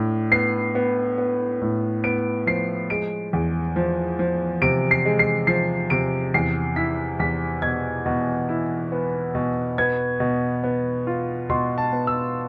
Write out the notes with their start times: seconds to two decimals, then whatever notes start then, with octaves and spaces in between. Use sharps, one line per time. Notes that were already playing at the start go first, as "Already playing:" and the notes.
Already playing: A2 D4
0.31 B3 C7
0.75 B3
1.18 B3
1.61 A2
2.04 B3 D7
2.47 F3 C7
2.90 G#3 D7
3.33 E2
3.76 F3
4.19 F3
4.62 C3 D7
4.91 C7
5.05 G#3
5.19 C7
5.47 F3 C7
5.90 C3 D7
6.34 E2 C7
6.76 E4 B6
7.20 E2 B6
7.62 B2 G#6
8.06 B2
8.49 E4
8.92 B3
9.35 B2
9.78 B3 G#6
10.20 B2
10.64 B3
11.07 F4
11.50 B2 C6
11.78 A5
11.92 B3
12.07 E6